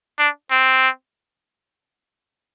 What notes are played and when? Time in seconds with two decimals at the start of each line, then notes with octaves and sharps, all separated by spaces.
0.19 D4
0.51 C4